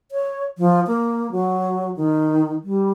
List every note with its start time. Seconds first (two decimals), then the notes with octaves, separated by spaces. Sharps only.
0.12 C#5
0.58 F3
0.87 A#3
1.32 F#3
1.97 D#3
2.64 G3